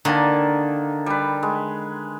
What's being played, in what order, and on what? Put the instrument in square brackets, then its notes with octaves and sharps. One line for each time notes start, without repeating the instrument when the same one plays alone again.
[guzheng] D3 [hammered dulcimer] D#3 A#3 A5
[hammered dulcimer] G3 B4
G#3